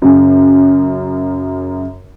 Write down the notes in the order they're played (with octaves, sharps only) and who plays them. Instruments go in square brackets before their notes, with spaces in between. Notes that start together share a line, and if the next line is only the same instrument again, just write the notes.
[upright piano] F#2 C#3